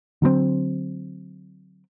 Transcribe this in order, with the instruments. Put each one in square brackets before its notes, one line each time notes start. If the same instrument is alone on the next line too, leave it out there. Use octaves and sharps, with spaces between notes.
[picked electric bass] D3 F#3 G3 C4